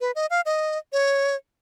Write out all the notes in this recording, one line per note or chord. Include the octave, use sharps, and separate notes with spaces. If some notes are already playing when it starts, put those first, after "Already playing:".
B4
D#5
F5
D#5
C#5